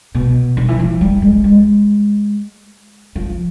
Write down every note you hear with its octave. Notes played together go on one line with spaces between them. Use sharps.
B2
D#3
E3
F3
G3
G#3
G#3
F3